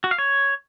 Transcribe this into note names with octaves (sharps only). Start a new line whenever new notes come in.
F#4
F5
C#5